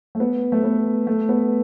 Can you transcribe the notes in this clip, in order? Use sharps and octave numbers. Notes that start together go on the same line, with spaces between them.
A3
B3
A3
B3
A3
B3